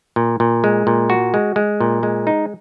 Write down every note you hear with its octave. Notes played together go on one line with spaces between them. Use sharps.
A#2
A#2
G#3
A#2
F#4
G#3
G#3
A#2
G#3
D#4